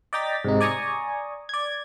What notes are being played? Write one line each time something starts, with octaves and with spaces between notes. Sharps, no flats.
D5 D#5 G5 A#5 A6 B6
G#2 C3 D#4
D5 G#5 A#5 C#6 D#6
D5 G#6